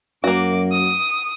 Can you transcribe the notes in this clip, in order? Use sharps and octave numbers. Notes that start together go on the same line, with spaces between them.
F#2 A#3 F#4 D6
D#6